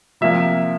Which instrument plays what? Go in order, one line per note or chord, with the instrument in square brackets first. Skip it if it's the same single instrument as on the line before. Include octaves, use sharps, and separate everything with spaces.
[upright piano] C3 F3 A#3 E5